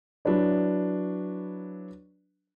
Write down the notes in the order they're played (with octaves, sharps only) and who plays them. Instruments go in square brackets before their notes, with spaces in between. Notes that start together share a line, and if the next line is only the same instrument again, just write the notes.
[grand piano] F#3 D4 E4 B4 D5